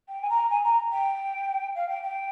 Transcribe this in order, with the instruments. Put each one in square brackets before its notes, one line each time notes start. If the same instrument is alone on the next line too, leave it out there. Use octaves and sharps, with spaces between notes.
[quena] G5
G#5
A#5
G#5
A#5
G5
F5
G5
G5